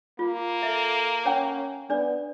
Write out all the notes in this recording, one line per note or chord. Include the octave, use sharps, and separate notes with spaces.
A#3 F4
A4 E5
C#4 C#5 F#5 G5
B3 D4 D5